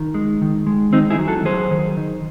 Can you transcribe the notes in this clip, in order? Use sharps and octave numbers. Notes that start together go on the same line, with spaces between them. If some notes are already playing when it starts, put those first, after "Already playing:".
Already playing: D#3
G#3
D#3
G#3
D#3 C4 D#4
E4 G#4
F#3
F#4 A4
F#3 G#4 C5
D#3
D#3